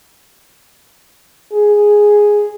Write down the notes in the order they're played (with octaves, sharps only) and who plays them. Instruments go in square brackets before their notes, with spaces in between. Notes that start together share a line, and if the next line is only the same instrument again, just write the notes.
[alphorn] G#4